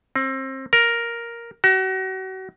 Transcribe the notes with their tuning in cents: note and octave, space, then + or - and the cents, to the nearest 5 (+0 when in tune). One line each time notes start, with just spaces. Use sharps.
C4 +30
A#4 +5
F#4 +35